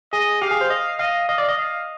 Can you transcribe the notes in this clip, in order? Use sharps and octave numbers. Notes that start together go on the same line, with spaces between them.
G#4 D#5
G4 F5
G#4
C5
D#5
D#5 F5
D#5 F5
D5
D#5
F5